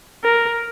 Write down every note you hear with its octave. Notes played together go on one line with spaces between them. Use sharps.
A#4